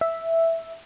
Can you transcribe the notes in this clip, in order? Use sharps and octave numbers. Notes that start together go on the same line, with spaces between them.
E5